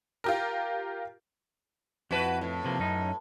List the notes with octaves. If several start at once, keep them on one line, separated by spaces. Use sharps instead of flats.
F4 G4 A#4
F2 E4 F#4 B4 A5
A2
C3 F3 A#3
F#2 C#4 D#4